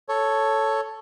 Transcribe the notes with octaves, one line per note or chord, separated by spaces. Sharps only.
A4 C#5